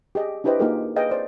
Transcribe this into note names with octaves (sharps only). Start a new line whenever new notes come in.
G4 G#4 D#5
D4 E4 G4 B4 C5 D#5
A#3 D#4 F4 G4 G#4 A#4
G#4 B4 D#5 F5 G5
C5 D5